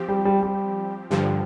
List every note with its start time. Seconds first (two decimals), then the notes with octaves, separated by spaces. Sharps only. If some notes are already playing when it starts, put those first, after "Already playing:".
Already playing: F3 C4 G4
0.09 G3
0.25 G3
0.43 G3
1.10 G2 D3 F3 G3